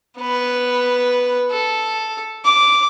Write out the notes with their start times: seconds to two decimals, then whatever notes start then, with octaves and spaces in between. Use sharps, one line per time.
0.19 B3 B4
1.51 A4
2.45 D6